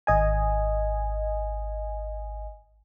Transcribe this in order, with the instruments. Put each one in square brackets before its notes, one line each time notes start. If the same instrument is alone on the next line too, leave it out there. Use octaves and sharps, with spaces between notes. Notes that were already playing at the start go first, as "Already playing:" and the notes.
[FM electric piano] G#1 D#5 G#5